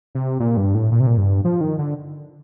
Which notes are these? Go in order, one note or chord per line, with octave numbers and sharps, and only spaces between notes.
C3
A#2
G2
A2
A#2
C3
A#2
G2
F3
D#3
D3